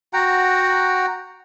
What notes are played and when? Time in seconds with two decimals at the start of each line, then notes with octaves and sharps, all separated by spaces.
0.13 F#4 F#5 G5 A#5